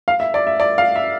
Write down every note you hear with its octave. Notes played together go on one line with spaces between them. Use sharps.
F5
E5
D5
E5
D5
F5
E5